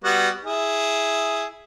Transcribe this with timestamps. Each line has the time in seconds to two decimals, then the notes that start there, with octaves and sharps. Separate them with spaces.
0.04 G3 B3 F#4
0.45 E4 G#4